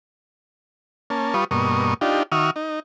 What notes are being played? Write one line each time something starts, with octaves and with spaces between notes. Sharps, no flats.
A#3 C#4 A5
G3 F4 B4 C#6 D#6
G2 B2 A#3 C#6 D#6
D4 D#4 F4 G4
D#3 F#4 E5 C#6 D#6 F6
D#4